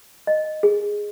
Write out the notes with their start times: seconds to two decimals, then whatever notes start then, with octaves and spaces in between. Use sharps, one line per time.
0.27 D#5
0.63 G#4